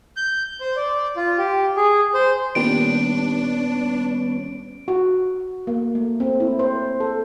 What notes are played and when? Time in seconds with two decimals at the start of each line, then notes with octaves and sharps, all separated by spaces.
0.16 G6
0.61 C5
0.76 D5
1.17 F4
1.38 G4
1.77 G#4
2.14 C5
2.55 A#2 D#3 G3 B3 C#4 D4 D7
4.88 F#4
5.67 A#3
5.95 A3
6.20 C4
6.40 E4
6.59 C5
7.00 A4